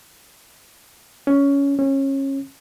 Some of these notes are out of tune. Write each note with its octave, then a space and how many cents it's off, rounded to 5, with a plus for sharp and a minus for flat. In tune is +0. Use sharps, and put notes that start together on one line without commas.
C#4 +15
C#4 -25